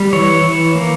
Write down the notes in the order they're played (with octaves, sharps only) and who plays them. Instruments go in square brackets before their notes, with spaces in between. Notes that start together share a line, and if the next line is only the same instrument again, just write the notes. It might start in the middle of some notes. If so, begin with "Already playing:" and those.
Already playing: [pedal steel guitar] G3
E3 C#5
E3
A#3